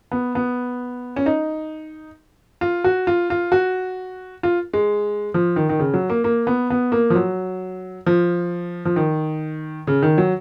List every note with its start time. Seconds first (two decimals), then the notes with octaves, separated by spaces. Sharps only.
0.12 B3
0.35 B3
1.16 C#4
1.26 D#4
2.61 F4
2.84 F#4
3.07 F4
3.30 F4
3.52 F#4
4.43 F4
4.73 G#3
5.34 F3
5.56 D#3
5.69 D#3
5.79 C#3
5.94 F#3
6.10 A#3
6.24 A#3
6.47 B3
6.70 B3
6.92 A#3
7.10 F3
7.15 F#3
8.06 F3
8.85 F3
8.96 D#3
9.87 C#3
10.02 D#3
10.18 F#3